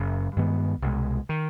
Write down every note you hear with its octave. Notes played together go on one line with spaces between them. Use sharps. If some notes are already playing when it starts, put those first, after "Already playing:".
Already playing: F#1 F#2 C#3 F#3
G2 D#3 G#3 B3
C2 B2 G#3
D#3